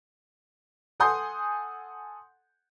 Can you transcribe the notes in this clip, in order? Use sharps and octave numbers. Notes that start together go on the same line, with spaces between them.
A4 F#5 G#5 C6 D#6 G6